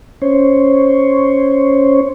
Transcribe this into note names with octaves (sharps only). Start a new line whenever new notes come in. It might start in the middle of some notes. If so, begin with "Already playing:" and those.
C#4 C5 C#5